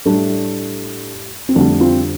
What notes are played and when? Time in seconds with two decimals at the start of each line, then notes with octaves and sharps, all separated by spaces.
0.05 A2 G3 A3 D4
1.49 C4
1.55 F2 D3 G3 A3 D4
1.80 C4 F4